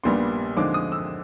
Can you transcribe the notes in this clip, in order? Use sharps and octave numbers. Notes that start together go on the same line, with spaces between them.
A#1 A#2 G3 B3 D4 C6
D#2 D3 F3 G#3 C4 D6
D#6
E6